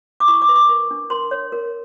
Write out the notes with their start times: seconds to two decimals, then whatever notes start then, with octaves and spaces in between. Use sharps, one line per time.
0.20 D6
0.28 E4 C#6
0.42 D6
0.49 B4
0.56 D6
0.69 A#4
0.91 D4
1.10 A#4 C6
1.31 C#5
1.52 A#4